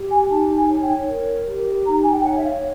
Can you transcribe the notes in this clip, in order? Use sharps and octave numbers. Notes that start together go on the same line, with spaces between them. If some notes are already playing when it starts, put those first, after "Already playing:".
Already playing: G4
G#5
D#4 A5
G#5
C#5
G5
A#4
G4
D#4 A#5
G#5
G5
C#5 F#5
E5
F5